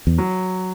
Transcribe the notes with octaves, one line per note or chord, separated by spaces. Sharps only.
E2
F#3